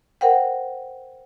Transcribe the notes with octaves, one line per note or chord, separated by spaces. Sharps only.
A#4 C5 F#5 G5